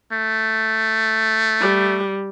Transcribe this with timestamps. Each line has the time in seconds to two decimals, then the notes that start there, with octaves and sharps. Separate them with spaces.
0.12 A3
1.61 G3